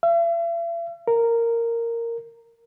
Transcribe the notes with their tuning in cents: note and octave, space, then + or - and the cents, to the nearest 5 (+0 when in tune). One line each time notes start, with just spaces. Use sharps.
E5 +45
A#4 -10